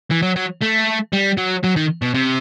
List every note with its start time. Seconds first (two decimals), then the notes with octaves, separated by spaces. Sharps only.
0.11 E3
0.22 F#3
0.36 F#3
0.61 A3
1.13 G3
1.37 F#3
1.64 F#3
1.76 D#3
2.02 B2
2.15 C3